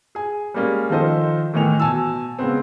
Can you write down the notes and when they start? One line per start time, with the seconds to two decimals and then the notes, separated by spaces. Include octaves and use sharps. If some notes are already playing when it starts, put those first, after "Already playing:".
0.15 G#4 G#5
0.54 G3 G#3 A#3 C#4
0.90 D#3 F3 A4 C5 D#5
1.53 A2 D#3 E3 D#4 F7
1.80 B2 G#5 A5 E6
2.38 C#3 G#3 B3 C4